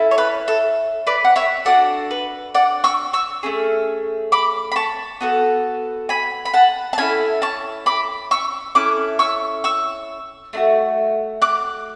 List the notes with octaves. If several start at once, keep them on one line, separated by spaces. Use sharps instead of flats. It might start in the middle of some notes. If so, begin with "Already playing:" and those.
Already playing: C#4 E4 A4
C#5
B4
A4
B4 D5
F#5
C#5 E5
D4 F#4 A4 D5 F#5
B4
D5 F#5
C#6 E6
C#6 E6
A3 C#4 G#4
B5 D6
B5
A5 C#6
B3 F#4 A4
G#5 B5
B5
F#5 A5
A5
C#4 E4 A4 G#5 B5
A5 C#6
B5 D6
C#6 E6
C#4 E4 A4 D6 F#6
C#6 E6
C#6 E6
A3 D4 F#4
D6 F#6